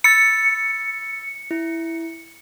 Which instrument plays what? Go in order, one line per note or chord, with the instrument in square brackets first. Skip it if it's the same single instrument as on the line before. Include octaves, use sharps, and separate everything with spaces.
[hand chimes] B5 E6 A6 [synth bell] C#7
[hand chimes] E4